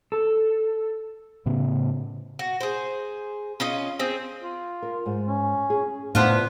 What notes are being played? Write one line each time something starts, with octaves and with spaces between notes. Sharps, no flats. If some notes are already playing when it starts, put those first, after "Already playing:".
A4
A2 C#3 A3 B3
F#4
G#4 C5
C#4 F4 D#5
C4 G#4
F4
A#4
G#2
C#4
G#4
A2 C3 B3 D4 F4 C5